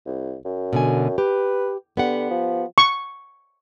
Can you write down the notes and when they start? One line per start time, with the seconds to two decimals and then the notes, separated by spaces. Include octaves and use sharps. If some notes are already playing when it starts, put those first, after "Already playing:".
0.06 C2
0.45 F#2
0.73 B2 D3 G#5
1.18 G4 B4
1.97 D3 B3 G4 F#5
2.30 F3
2.78 C#6